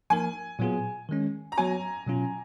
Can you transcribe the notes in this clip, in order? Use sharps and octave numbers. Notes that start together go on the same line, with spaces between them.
F3 A#3 D#4 A#4 G#5
A#2 F#3 B3 F4 G#4
D#3 G#3 C#4
A#5
F#3 B3 F#4 C#5 G#5
B2 F#3 C#4 F4